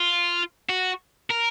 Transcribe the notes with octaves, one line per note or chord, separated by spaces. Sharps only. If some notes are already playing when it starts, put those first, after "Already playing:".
Already playing: F4
F#4
A#4